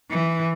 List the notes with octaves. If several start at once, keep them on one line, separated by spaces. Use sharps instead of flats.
E3